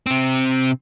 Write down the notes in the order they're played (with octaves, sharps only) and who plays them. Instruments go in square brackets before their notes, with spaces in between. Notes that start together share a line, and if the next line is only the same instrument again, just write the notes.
[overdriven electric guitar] C3 C4